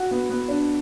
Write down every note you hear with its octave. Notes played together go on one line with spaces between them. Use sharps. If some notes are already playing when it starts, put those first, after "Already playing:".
Already playing: F#4
B3
B3
D4